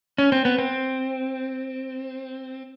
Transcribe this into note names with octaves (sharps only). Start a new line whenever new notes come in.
C#4
C4
B3
C4